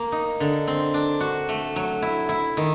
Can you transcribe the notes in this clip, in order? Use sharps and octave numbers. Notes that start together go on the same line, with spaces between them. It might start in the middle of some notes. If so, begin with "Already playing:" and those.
Already playing: A#3
D#4
D3
C4
D4
F#4
A3
F#3
E4
E4
D#3